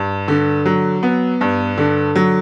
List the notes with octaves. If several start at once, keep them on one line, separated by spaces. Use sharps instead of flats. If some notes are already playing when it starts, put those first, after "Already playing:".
Already playing: G2
D3
F#3
B3
G2
D3
F#3